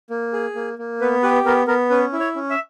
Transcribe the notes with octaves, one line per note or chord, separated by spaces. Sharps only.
A#3
G#4
A#3
A#3
B3 B4
G4 B4
B3 A#4
B3 A#4
C#4 B4
E4
C#5
C#4
E5